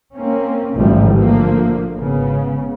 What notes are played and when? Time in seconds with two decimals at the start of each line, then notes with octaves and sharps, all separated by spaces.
0.17 A#3 C4 C#4
0.75 A1 G#2 D3 F3 G3 A3
1.17 D3 F3 A3 A#3
1.96 G#1 C#3 B3